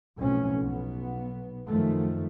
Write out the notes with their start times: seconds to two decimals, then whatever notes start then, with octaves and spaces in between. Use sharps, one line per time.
0.19 B1 F2 A2 C#4
0.59 B1 B3
1.68 F#2 D#3 F3 A3